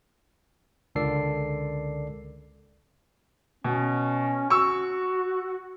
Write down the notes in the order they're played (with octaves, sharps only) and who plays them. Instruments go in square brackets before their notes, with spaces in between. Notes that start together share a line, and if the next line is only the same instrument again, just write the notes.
[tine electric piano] C#2 D3 A4 A#4 D5 C7
[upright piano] B2 [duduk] C#4
[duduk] F#4 [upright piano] C#6 E6